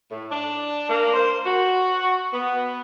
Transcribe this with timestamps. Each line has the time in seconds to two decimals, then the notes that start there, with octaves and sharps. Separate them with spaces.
0.10 A2
0.30 D4
0.89 A#3
1.14 C5
1.45 F#4
2.32 B3